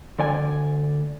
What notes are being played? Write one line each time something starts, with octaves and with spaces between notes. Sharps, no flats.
D2 D5 G#5